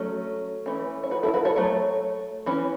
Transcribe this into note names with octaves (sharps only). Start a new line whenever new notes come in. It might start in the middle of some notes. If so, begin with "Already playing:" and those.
Already playing: F#3 A3 C#4
E3 A3 C#4
C#5
F#4 B4
E4 A4
F#4 B4
A4 C#5
F#3 A3 C#5
E3 C#4